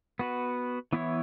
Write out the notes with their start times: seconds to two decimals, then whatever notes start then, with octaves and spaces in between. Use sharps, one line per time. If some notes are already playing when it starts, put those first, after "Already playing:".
0.19 B3 F#4 B4
0.93 E3 B3 E4 C#5